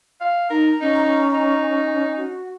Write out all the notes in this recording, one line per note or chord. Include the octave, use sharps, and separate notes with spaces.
F5
D#4 A#4 A#5
C#4 D#4
D#4
F#4